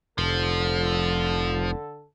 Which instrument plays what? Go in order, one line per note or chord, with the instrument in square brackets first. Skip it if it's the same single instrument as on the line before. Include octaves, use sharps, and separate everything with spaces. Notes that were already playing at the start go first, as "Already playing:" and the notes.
[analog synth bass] F1 [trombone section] D3 A4 [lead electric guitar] F3